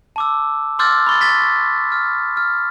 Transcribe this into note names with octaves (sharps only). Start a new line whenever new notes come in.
A5 D6 E6
C6 D6 E6 F6 G6 A6
B5 C#6 A6
C#6 A6 B6
F6
F6